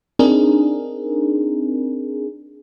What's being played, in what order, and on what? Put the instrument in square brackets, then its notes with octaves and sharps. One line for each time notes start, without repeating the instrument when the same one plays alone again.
[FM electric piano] C4 D4 D#4 G#4 A#4